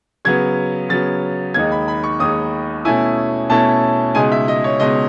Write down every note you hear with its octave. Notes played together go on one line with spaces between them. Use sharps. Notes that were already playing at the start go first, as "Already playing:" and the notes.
C#3 F#3 B3 G#6
C#3 F#3 B3 A6
D#2 D#3 G#3 D#4 G#6
B5
B5
C#6
D#2 D#3 G#3 D#4 D#6
B2 A3 C#4 E4 G#5
B2 A3 C#4 E4 A5
C#2 B2 G#3 D#4 G#5
E5
D#5
C#5
C#2 B2 G#3 D#4 D#5